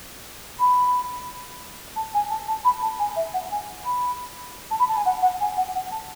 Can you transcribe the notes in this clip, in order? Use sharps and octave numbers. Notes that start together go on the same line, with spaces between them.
B5
A5
G#5
A5
A5
B5
A5
G#5
E5
F#5
G#5
B5
A5
B5
A5
G#5
F#5
F#5
G#5
F#5
F#5
A5